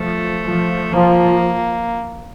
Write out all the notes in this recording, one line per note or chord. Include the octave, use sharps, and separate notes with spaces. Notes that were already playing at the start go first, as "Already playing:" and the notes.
Already playing: F3 A3
F3
F3 A#3